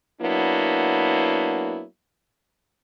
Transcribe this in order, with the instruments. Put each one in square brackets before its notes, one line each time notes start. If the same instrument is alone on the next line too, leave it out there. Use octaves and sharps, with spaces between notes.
[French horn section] F#3 A#3 B3 D4 E4